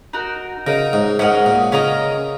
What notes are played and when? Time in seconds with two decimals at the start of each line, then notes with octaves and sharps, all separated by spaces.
0.13 D#4 F#4 A#4
0.66 C#3 D#4 F#4 A#4
0.93 G#2
1.19 G#2 C#4 A#4 D#5 F#5
1.46 A#2
1.72 C#3 C#4 A#4 D#5